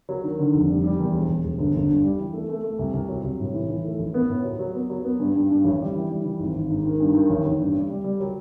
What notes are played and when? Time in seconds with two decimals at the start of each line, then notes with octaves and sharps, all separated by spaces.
0.09 F#3
0.24 D#3
0.38 D3
0.54 F1
0.69 G3
0.84 G3
0.99 E2
1.13 E1
1.29 E1
1.45 E1
1.58 G1
1.75 G1
1.89 G2
2.04 G3
2.18 E3
2.33 A3
2.49 A3
2.64 A3
2.79 C2
2.94 C2
3.09 F#3
3.24 C2
3.40 A2
3.54 E3
3.69 E3
3.84 A3
3.99 A1
4.14 B3
4.29 A2
4.44 F#3
4.59 F#3
4.75 B3
4.90 F#3
5.04 B3
5.20 G2
5.35 G2
5.50 G2
5.65 A1
5.80 G3
5.95 E3
6.10 G3
6.24 E3
6.39 G#1
6.55 G#1
6.70 G#2
6.85 D#3
7.00 G2
7.15 D#3
7.30 A1
7.45 A1
7.60 G2
7.75 G3
7.90 G3
8.04 G3
8.20 F#3